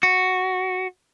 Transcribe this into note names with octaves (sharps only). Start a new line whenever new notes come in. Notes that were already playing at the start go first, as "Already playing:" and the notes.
F#4